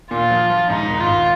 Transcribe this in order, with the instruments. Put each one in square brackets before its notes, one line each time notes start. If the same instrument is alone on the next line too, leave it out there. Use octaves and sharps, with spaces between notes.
[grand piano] A#2 [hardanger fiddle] F4
[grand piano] F3
F3
[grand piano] G#2 [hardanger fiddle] D#4
[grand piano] G#1
[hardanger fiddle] F4
[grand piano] G#1